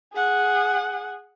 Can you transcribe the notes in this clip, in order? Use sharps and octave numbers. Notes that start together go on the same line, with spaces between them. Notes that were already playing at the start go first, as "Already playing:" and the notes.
G#4 F#5